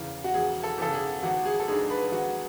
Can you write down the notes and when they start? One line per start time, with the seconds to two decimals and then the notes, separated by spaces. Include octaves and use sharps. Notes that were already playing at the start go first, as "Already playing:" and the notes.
Already playing: E1 E2 C#3
0.24 F#4
0.34 E1 G#4
0.63 A4
0.78 E2 C#3 A4
0.93 G#4
1.23 G#1 F#4
1.45 G#4
1.60 A4
1.67 G#2 G#3 D4 G#4
1.90 B4
2.12 G#1 F#4